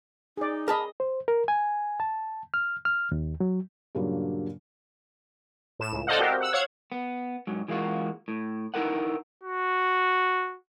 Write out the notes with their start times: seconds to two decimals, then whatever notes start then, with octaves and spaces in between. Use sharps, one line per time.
0.37 D#4 G#4 D5
0.68 G#4 A#4 D#5 A5 B5
1.00 C5
1.28 A#4
1.48 G#5
2.00 A5
2.54 F6
2.85 F6
3.12 D#2
3.40 F#3
3.95 G2 A#2 C#3 F#3 A#3 D4
5.79 A2 E7
5.92 C#2
6.07 A4 C5 D5 D#5 F5 F#5
6.19 C4 F#4 G4 A#4 C5
6.41 F#5 E6
6.53 C#5 F5 F#5 G#6
6.92 B3
7.47 G#2 F#3
7.68 E3 G#3 A#3 F4 F#4
8.28 A2
8.74 D#4 E4 G#4 A#4 B4 F#5
9.43 F#4